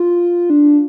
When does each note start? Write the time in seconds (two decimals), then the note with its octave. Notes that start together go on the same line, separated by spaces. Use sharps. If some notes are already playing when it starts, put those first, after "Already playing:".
Already playing: F4
0.50 D4